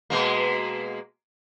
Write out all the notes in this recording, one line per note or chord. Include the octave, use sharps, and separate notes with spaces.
B2 G#3 A#3